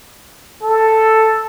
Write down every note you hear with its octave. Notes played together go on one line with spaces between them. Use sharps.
A4